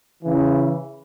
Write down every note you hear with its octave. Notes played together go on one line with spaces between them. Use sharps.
C#3 E3